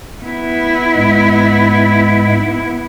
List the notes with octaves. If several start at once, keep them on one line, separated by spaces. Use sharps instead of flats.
B3 E4
G#2 G#3